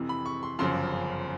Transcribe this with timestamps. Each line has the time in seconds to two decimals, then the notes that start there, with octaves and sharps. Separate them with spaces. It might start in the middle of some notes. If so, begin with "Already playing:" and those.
Already playing: F2 C3 E3
0.09 B5
0.26 C#6
0.43 C6
0.59 G1 F#2 C#3 F3 C6